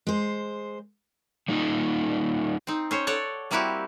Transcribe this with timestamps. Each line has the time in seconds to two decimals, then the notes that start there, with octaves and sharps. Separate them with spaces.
0.07 G#3 C5
1.48 G3 A#3 D#4 F4
2.67 C4 D#4
2.91 C#4 C5 C#5
3.07 A4 C#5 D5 F#5
3.51 G3 A#3 C4 E4 F#4 G4